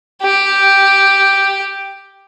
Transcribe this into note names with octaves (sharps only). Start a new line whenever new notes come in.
G4